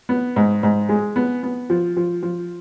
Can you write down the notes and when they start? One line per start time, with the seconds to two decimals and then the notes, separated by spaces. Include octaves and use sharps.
0.09 B3
0.36 G#2
0.63 G#2
0.89 G#3
1.16 B3
1.43 B3
1.70 F3
1.97 F3
2.23 F3